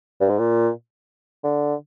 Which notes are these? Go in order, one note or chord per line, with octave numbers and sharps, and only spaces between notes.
G2
G#2
A#2
D3